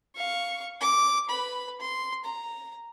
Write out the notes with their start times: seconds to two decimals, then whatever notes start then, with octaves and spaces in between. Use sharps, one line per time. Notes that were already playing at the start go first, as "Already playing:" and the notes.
0.16 F5 C#6
0.81 D6
1.29 B4 B5
1.80 C6
2.25 A#5